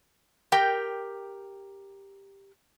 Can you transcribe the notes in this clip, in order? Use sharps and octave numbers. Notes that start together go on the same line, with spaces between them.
G4 A#4 G5